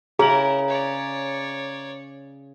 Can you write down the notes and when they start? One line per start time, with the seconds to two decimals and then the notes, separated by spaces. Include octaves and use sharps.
0.19 C#3 E4 G#4 A#4 A#5 F#7
0.69 C#5 D5